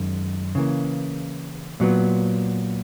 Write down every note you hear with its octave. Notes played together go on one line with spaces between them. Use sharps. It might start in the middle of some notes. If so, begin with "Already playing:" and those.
Already playing: F#2 D#3 G#3
C#3 E3 A#3
A#2 F#3 B3